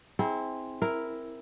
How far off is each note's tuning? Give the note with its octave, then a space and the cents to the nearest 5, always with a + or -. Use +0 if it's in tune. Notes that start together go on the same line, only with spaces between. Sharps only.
C4 +0 E4 -35 G#4 +5
E4 +0 A#4 +0